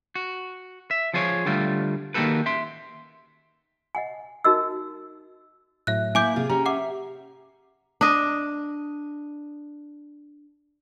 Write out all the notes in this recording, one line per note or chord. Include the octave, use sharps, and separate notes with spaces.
F#4
E5
F3 F4 G#4 B4 C#5
D3 G3 A3 F4
D#3 A#3 F#4 G4 A4 B4
E5 C6
D#5 F#5 G#5
D#4 F#4 A#4 D#5 E6
A2 F#3 E5 F#6
A#3 E4 G#5 D6 G6
C3 F4 G#4
C#4 G4 A#5
E5 F#5 D6
D4 D#5